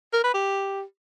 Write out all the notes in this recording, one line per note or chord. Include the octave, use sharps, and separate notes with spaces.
A#4
B4
G4